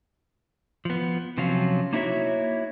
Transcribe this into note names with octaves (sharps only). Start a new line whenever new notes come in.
F3 B3
C3 F3 F#3 C#4 F4
A#3 D#4 E4 F#4 C#5 E5